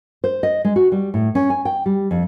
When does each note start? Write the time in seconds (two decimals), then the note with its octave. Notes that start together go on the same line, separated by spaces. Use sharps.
0.24 C5
0.43 D#5
0.65 G#3
0.76 F#4
0.92 G3
1.14 A2
1.35 C#4
1.50 G#5
1.65 G5
1.86 G3
2.11 F2